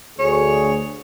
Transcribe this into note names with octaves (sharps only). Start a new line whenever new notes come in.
D2 G#4 C#5